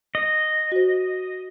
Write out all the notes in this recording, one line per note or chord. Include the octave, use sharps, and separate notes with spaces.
D#5
F#4 C5